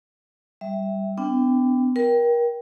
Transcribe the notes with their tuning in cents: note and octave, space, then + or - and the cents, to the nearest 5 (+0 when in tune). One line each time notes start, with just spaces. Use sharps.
G3 +0 E5 +0
B3 +40 D4 +0 G5 +5
A#4 +30 G5 +0